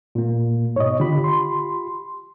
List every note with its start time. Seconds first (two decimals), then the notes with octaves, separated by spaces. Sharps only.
0.15 A#2 A#3
0.76 G#2 B2 C#5 D#5
1.00 D3 F4 G4 B5
1.24 C6